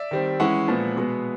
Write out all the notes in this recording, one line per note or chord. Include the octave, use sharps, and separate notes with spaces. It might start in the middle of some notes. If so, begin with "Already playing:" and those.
Already playing: D5 E5
D#3 G3 C4
E3 G#3 C#4 E4 E5 F#5
A#2 F3 G#3 B3
B2 G#3 B3